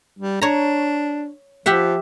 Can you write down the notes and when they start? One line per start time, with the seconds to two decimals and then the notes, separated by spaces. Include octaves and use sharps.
0.19 G3
0.42 D4 C#5 A#5
1.66 F3 G4 E5 F#5